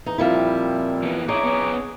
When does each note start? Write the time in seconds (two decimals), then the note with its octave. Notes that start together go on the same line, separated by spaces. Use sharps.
0.06 E2 E3 D#4
0.18 F2 A#2 F3 G3 C4 E4
1.03 E3 A#3 B3
1.29 D#4 E4 G#4 C#5 A#5 D6
1.43 B3 C#4 D#4